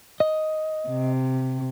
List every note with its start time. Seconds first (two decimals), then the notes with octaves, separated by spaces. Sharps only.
0.20 D#5
0.88 C3